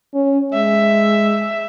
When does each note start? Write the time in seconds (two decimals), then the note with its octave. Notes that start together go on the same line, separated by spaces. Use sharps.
0.14 C#4
0.53 G#3 E5